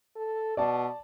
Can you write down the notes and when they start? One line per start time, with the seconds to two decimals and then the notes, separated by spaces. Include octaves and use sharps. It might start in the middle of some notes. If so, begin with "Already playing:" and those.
0.16 A4
0.57 B2 D5 A5